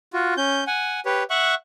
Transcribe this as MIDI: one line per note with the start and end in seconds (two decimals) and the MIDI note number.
0.13 0.34 65
0.13 0.34 66
0.37 0.64 61
0.37 0.64 91
0.67 1.00 78
0.67 1.00 80
1.05 1.23 67
1.05 1.23 71
1.05 1.23 73
1.30 1.55 76
1.30 1.55 78
1.30 1.55 85
1.30 1.55 90